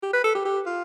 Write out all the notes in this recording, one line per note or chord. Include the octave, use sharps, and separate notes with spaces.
G4
B4
A4
G4
G4
F4